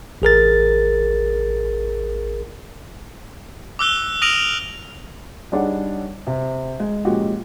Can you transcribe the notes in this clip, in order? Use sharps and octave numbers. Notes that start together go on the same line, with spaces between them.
A1 G#4 A#4 A6
D6 E6 F#6 G7
D#6 F6 A#6 D7 D#7 F7
G3 D4 D#4 G#4 C#5 F#5
C3
G#3
A#2 F3 G#3 C#4 F#4 G4